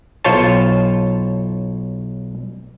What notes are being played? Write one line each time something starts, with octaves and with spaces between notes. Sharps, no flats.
B1 F4 C5 C#5 A5